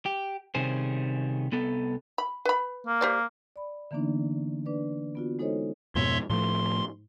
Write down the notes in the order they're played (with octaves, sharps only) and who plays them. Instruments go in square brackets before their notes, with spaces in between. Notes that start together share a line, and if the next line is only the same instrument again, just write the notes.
[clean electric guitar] G4
C3 D#3 G3 C#4 G#4 C5
C2 B3 A4
[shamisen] B5
B4 B5
[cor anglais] A#3
[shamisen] G4 C5 D5
[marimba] D5 B5
D3 E3 A#3 B3 D4 D#4
D4 B4 D5
B3 F4 F#4
G#3 D#4 A4 C5 C#5 D#5
[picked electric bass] F2 G#2 B2 [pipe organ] C#5 E5 C6
[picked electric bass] A2 F3 A3 [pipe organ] C6